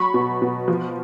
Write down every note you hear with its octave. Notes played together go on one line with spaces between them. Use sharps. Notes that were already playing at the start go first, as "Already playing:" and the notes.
Already playing: F#3 B5 C#6
B2
B2
F3